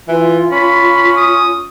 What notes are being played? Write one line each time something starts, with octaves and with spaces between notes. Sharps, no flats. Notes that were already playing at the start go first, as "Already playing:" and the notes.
E3 F4
C#4 B5
D#6